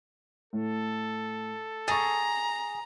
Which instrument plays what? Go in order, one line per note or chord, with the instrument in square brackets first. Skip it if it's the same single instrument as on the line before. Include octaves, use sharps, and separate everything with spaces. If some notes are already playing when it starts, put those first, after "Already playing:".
[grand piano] A2 [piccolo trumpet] A4
[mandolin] G#4 [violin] A#5 [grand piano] C#6 A6